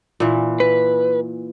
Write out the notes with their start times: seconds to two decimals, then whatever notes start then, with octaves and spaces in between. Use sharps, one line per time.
0.20 A#2 E3
0.60 B4